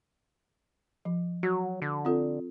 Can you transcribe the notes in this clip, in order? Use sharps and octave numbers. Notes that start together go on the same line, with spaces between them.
F3
F#3 F#4
D3
C4 F4 A4